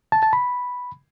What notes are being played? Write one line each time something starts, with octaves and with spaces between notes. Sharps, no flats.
A5
A5
B5